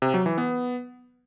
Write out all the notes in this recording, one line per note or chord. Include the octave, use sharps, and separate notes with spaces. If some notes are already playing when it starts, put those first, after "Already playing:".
C3
F#3
E3
B3